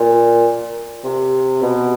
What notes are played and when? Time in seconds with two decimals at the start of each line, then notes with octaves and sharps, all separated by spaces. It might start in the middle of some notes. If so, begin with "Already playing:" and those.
Already playing: A#2
1.04 C3
1.62 B2